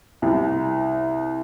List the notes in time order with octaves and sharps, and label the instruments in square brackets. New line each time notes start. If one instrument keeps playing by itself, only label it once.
[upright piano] C2